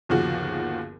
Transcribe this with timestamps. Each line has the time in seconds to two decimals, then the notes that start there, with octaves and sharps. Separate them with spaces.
0.09 G1 D#2 C#3 F3 F#4 G#4